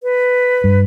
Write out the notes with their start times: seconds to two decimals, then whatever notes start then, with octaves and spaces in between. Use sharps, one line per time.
0.03 B4
0.64 G2